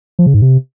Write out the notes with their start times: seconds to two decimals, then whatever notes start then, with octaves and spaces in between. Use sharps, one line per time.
0.19 F3
0.26 C#3
0.34 G#2
0.42 C3